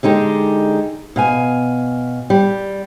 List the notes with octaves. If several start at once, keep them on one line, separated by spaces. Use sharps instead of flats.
D3 G#3 D#4 G4
B2 F5 G#5
G3